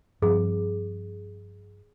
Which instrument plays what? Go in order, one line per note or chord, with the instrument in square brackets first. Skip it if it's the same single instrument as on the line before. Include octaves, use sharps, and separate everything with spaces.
[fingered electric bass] G2 F3 C4 [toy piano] G#4